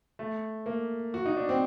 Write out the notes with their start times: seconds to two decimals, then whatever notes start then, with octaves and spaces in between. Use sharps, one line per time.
0.19 A3
0.66 A#3
1.14 F#4
1.26 D#4
1.36 D4
1.49 C4